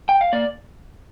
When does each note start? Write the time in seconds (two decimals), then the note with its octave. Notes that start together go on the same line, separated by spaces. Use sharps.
0.09 G5
0.21 F5
0.33 A#3 D5